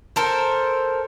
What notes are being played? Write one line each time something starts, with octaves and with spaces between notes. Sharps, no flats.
A4 A#4 C5